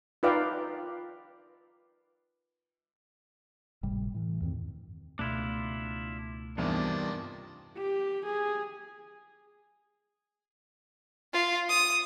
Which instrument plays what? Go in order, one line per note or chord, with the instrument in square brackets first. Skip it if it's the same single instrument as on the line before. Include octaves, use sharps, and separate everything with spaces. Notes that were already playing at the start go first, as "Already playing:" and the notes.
[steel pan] D#4 F4 B4 D5 F5 G5
[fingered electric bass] G#1 A2 C3 G3
A2 E3
E2 G2 D#3 C4
[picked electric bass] C#2 B2 A3 [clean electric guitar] D4 E4 F4
[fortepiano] E2 [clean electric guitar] G2 C3 A#3 [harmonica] D#3 F3 D4
[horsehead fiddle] G4
G#4
[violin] F4
D#6